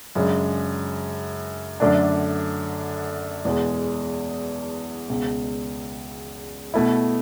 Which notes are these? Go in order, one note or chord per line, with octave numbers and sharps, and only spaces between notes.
F#2 C#3 G#3 D4
F#2 D3 A3 D4
E2 B2 G#3
C#2 B2 G#3
B2 A3 E4